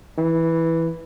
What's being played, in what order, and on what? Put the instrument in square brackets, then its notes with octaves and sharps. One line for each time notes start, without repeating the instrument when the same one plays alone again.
[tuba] E3